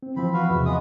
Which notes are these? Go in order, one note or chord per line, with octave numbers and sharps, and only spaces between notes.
C4
E3 F3 C4 F4 B5
F#4 B4 F5
E2 C3 E5
E2 G#3 B3 D#6